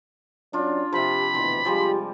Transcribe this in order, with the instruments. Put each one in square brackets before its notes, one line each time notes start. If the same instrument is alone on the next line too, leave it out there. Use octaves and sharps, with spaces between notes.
[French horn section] F#3 C#4 D5 [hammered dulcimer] D4 F4
[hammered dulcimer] C3 F3 [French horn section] G4 [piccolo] B5
[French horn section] D2 B2 E3 [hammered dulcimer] C6
[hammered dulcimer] F3 G3 G#3 [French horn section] F4 G4